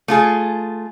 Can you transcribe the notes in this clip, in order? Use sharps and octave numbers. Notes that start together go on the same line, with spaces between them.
A3 F4 G#4